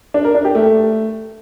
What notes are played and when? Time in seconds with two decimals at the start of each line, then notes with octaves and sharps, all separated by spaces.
0.14 D4
0.24 A#4
0.35 D4
0.45 G4
0.55 A3